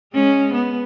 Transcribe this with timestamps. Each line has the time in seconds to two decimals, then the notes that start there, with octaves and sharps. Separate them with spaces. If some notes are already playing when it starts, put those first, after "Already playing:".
0.13 G#3 C#4
0.53 B3